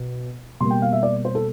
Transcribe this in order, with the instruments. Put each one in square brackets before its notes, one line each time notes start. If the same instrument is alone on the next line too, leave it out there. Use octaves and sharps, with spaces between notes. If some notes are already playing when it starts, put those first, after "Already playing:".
Already playing: [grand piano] B2
B2 G3 A#3 C6
G5
F5
E5
D5
C5
A4